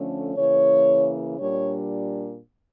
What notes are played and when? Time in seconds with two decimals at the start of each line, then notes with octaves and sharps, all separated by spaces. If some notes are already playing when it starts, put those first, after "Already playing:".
Already playing: D3 F3 A3 C#4
0.36 C#3 E3 A#3 C#5
1.38 A#2 G3 D4 C#5